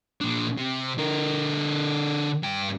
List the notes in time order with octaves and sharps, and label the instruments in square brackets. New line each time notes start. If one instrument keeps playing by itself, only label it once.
[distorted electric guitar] A#2 D4
C3
D3 A#4
G2 G5